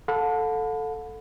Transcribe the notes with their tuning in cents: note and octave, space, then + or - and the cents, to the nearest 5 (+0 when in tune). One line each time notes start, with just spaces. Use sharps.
A4 +0 F#5 -45 B5 +15